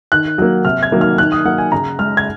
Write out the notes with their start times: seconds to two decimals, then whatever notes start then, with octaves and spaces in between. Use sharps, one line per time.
0.12 D#3 F#6
0.38 F#3 A#3
0.65 C3 F6
0.83 G#6
0.92 D#3 F#3 A#3
1.01 F6
1.18 D#3 F#6
1.32 D#6
1.45 F#3 A#3 F#5
1.58 G#5
1.72 C#3 A#5
1.99 G#3 F6
2.17 G#6